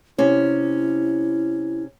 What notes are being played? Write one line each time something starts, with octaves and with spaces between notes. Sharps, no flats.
C3 C#4 E4